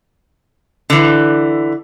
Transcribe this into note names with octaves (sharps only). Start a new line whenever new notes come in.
D3 E3